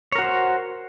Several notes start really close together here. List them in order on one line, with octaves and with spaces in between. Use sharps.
C#5 A#4 F#4 C5